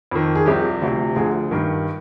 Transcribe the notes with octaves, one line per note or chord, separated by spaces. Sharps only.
F2 D#3
G#4
C2 C3 F3 G4
D2 C3 F3
D2 D3 F3 G#4
G2 D#3